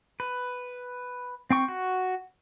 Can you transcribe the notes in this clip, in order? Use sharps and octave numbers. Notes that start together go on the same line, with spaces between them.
B4
C4 G5 C#6
F#4